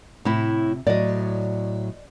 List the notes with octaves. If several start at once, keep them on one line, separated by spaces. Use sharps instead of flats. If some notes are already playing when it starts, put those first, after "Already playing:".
A2 C3 E4
A2 F#3 D5 D#5